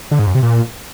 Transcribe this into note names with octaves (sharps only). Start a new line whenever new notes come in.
D3
G#2
F#2
C3
A#2